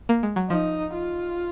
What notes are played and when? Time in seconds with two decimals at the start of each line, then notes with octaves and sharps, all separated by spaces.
0.09 A#3
0.23 G#3
0.36 F#3
0.50 F3 D#4
0.94 F4